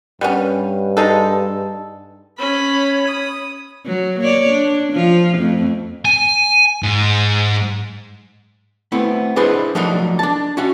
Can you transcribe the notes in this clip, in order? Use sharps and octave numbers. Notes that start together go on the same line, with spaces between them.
G2 G3 B3 C#4
G#3 D#4 A4
C#4 C#5 B5
D#6
F#3
A#3 C#5 D5
D4
F3 F4
F2 A3
G#5
G#2
A3 B3 C4 E4
D4 E4 G#4 B4 C5 D#5
F3 F#3 A3 A#3 D4 D#4
D4 A5
C#4 F#4 F5